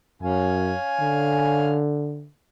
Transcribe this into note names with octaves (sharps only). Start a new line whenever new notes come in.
F#2 C#4 F5 G#5
D3